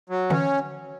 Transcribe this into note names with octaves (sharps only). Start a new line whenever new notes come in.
F#3
D3 E3 C#4